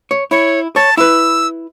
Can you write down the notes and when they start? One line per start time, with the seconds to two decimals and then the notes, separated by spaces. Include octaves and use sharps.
0.11 C#5
0.31 E4 C#5
0.76 C#5 A5
0.97 E4 B4 E6